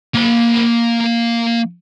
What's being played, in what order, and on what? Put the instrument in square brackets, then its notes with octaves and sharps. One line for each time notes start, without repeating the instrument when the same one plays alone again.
[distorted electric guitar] A#3 B5